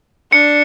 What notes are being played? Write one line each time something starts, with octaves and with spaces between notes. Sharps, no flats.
D4 C#7